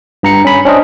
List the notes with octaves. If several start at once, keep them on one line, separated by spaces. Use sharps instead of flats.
G2 A#5 C#7
C#4 B5
C#4 D4 C5 D#5